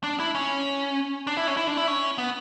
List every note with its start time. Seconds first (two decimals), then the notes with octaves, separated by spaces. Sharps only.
0.04 D4
0.20 E4
0.35 C#4
1.27 D4
1.37 E4
1.47 C#4
1.57 E4
1.67 D4
1.77 E4
1.88 C#4
2.18 B3